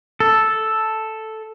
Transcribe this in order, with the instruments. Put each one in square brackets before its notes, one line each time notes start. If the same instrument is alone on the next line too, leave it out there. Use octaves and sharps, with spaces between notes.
[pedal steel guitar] A4